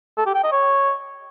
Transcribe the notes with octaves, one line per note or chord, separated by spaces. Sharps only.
A4
G4
G5
D#5
C#5